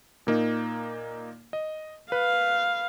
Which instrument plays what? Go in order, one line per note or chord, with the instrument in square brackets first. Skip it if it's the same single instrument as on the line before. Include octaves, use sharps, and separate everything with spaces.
[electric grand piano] A#2 A#3 D#4
D#5
[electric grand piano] B4 [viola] F5